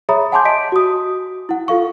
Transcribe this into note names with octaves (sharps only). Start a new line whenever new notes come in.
G#4 C#5 E5 A#5 B5 D#6
F#5 G#5 A5 C6 D6 G6
D#5 B6 D7
F#4 D#6
E4 F#5
F4 A4 F5 C#6